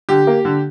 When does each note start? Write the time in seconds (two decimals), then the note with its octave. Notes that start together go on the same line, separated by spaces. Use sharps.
0.09 D3 G4
0.27 A#3
0.45 D3